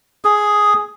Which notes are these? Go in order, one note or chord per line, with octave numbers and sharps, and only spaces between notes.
G#4